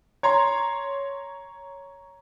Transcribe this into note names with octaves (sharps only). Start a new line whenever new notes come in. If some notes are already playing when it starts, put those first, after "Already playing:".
C#5 A#5 C6